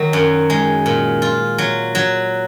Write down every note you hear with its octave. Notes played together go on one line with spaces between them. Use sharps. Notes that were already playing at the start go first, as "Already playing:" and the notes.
Already playing: D#3 F#3
F#2
G#3
A#2
F4
F#3
F#3